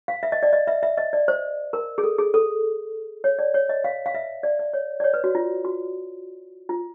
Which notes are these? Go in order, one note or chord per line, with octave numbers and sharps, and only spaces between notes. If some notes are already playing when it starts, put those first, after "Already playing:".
F5
E5
D#5
D5
D#5
E5
E5
D#5
D5
C5
A#4
G#4
A4
G#4
A4
C#5
D5
C#5
D#5
F5
F5
E5
D5
D5
C#5
D5
C#5
B4
F#4
F4
F#4
F4